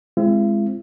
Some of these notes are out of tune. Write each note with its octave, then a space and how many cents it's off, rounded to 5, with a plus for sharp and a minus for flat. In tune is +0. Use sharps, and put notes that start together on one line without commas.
G#3 +0 C4 +0 E4 +45